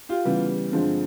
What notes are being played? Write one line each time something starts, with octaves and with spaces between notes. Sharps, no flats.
F4 G4
C#3 E3 G3 B3
G2 D3 F3 G#3 C4